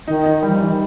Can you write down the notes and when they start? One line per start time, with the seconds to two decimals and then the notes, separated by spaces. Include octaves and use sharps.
0.07 D#3 D#4
0.26 D#4
0.43 E3 G3
0.50 F3
0.58 E3 D#4
0.71 D#3